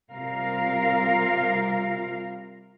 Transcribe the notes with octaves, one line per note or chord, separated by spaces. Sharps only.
C3 G3 F4 A#4 F5